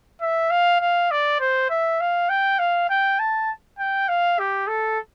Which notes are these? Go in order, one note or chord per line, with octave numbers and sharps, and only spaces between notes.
E5
F5
F5
D5
C5
E5
F5
G5
F5
G5
A5
G5
F5
G4
A4